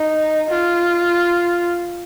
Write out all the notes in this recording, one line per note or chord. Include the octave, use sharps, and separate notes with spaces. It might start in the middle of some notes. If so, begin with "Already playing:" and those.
Already playing: D#4
F4